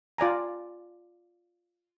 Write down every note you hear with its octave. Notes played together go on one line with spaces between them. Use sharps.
F4 D5 G#5 A#5